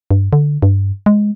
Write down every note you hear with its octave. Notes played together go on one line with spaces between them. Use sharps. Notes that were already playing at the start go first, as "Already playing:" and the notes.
G2
D3
G2
G#3